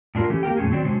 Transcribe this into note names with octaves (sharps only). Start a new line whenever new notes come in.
A2 D4 F4 A#4
E3 A3 C#4 G4
A#3 G4 A#4 G5
F2 A#2 A3 C#4 G#4
D#3 F#3 C4 D5
C3 F#3 G#3 C#4 D4 C5